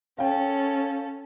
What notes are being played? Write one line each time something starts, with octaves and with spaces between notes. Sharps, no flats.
C#4 A4 F5 G5